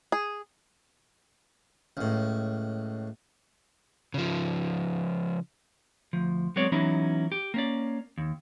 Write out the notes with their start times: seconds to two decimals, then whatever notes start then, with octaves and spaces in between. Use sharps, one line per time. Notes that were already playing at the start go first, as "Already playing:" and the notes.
0.12 G#4
1.97 C#2 A2
4.14 C#3 F3
6.13 D2 F3
6.56 F#3 G#3 B3 C4 C#5 D5
6.72 E3 F#3 B3 C#4 D#4 E4
7.32 G4
7.54 A#3 C#4 D5
8.18 D#2